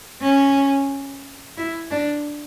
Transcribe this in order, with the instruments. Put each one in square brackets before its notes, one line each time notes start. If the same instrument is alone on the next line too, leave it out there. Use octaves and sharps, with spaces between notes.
[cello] C#4
E4
D4